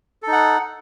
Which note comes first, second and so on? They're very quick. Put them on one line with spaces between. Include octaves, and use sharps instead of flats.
A4 D#4 F#5